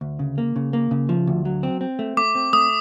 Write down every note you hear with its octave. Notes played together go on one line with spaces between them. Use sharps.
D2
C#3
A#3
C#3
A#3
C#3
F3
D2
F#3
C4
C4
A3
A3 D6
C4
A3 D#6